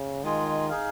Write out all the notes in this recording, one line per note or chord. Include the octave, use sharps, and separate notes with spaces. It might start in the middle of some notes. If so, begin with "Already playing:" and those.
Already playing: C#3
D#3 G#3 F4 G#4
D#4 G#4 F5